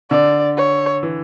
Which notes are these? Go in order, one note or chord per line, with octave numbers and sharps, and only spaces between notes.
D3 D5
C#5
E3